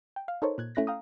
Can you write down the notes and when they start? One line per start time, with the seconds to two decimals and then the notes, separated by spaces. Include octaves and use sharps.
0.16 G5
0.28 F5
0.42 D#4 A4 A#4 C5 C#5
0.58 A#2 F#6 G#6
0.75 A3 C#4 E4 F#6 A#6 B6
0.87 F5 G5 A#5 D#6